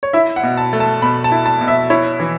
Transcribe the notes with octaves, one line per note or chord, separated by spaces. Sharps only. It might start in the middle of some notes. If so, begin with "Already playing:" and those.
C#5
E4 E5
F#5
B2
A5
A3
A5
B2 B5
A5
E4
A5
B2
E5
E4 C#5
E3